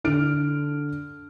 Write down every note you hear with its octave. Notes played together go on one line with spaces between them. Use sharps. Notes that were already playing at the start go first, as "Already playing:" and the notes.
D3 F6 D7